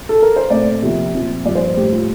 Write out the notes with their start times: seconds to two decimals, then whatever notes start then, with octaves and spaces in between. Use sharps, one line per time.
0.09 A4
0.22 A#4
0.36 C5
0.50 A#2 A3 C4 D5
0.82 C3 F3 A#3
1.13 A#2 F3 C4
1.45 G2 F3 A#3 D5
1.55 C5
1.77 A2 G3 A#3 G4
1.92 F4